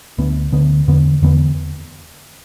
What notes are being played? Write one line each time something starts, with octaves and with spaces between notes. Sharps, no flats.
D2 D3 B3
D2 D3 B3
E2 D3 B3
E2 D3 B3